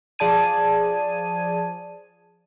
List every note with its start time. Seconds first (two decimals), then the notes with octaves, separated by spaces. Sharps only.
0.19 F3 G#4 D5 A5 G#6 D#7